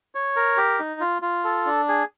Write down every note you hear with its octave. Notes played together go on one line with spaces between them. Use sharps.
C#5
A#4
G4
D#4
F4
F4
A4
D4
G#4